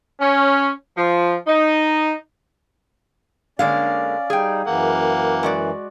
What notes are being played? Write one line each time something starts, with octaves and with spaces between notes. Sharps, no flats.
C#4
F3
D#4
D3 G#3 A#3 C#4 D5 F5
G3 D#4 G#4 G5
F#2 E3 A#3 F#5
G#3 F#4 D5